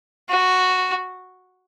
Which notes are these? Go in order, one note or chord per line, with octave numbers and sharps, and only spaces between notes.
F#4